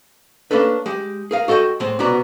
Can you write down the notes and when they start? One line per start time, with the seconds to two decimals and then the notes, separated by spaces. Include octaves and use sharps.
0.51 A#3 C#4 D4 A4 B4
0.86 G#3 G4
1.31 G#4 A#4 F5
1.48 F#4 A4 D#5 E5 G5
1.80 A2 G#3 C4
1.99 C2 B2 B3 F#4 D5 A#5